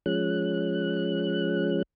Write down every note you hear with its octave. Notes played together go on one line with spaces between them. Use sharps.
F3 G#3 C#4 F#6